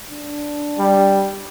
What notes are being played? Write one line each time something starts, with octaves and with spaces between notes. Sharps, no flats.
D4
G3